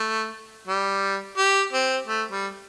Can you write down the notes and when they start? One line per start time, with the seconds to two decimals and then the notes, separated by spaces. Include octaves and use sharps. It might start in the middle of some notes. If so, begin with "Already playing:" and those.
Already playing: A3
0.67 G3
1.37 G4
1.73 C4
2.07 A3
2.30 G3